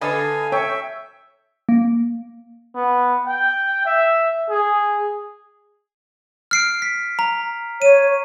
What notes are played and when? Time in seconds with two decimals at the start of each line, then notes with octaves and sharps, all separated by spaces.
0.01 D3 A4 B4 D#5 F5 G#5
0.52 C#5 E5 G5
1.69 A#3
2.75 B3
3.26 G5
3.85 E5
4.49 G#4
6.51 F6 C7 D7
6.82 B6
7.19 A#5
7.82 C#5 D#7